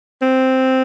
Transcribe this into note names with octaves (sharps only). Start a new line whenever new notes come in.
C4